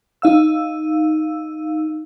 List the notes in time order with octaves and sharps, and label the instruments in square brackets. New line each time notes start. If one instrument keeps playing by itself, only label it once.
[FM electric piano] D#4 F5 E6